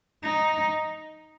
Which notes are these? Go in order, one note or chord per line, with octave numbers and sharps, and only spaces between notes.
D#4